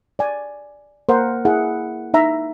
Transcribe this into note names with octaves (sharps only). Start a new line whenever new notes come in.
D5 G#5
A#3 A#4 C5 F#5
E4 G#4 F#5
D#4 E5 A#5